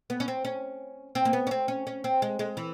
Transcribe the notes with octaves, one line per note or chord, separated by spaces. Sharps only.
B3
C#4
C4
C#4
C4
A#3
B3
C#4
C4
C#4
C#4
C4
G#3
G#3
E3